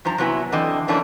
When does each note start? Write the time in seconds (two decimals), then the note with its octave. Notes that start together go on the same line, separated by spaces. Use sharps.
0.05 G2 F3 C5 A#5
0.18 C3 F#3 B3 E4 G#5
0.52 D3 E3 C4 D#5
0.88 F2 E3 A3 A#3 C#4 D4